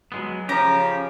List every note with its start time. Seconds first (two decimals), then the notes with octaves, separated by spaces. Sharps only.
0.12 F#3 G#3 B3
0.49 C#3 F3 C#4 G4 A#5